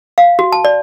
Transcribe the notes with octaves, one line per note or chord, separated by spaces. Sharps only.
F5
F#4
A5
D5